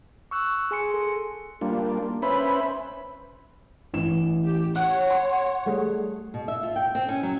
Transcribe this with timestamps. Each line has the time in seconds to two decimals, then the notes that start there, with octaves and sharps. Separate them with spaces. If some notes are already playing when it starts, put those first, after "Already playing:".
0.31 C#6 E6 F#6
0.71 G#4 G#5 C6 C#7
0.94 A4
1.61 G3 A#3 D4 F4
2.22 C#4 B4 C5 E5 B5
3.94 A1 E3 E7
4.43 G4
4.76 C#5 F#5 F#6
5.10 C6
5.66 G3 A3 G#4
6.34 B2
6.48 E5
6.63 F4
6.76 G5
6.95 C4
7.09 C#4
7.23 F#3